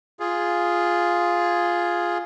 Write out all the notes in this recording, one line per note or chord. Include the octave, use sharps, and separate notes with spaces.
F4 G#4